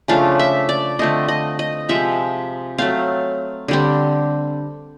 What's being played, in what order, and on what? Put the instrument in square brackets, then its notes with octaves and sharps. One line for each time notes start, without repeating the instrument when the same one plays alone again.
[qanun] C#3 F3 A3 D4 F5
E5
D5
D3 F3 A3 C4 D#5
D#5
D#5
C3 F3 G#3 E5
F#3 A3 C4 F5
D3 G3 C4